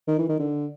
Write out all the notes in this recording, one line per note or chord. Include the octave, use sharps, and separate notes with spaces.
D#3
E3
D#3
D3